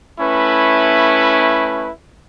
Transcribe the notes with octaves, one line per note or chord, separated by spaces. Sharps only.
A3 C#4 E4 B4